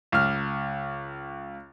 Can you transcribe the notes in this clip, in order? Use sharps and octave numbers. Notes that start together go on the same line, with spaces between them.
C#2 F6